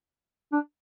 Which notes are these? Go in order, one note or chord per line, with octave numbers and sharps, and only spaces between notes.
D4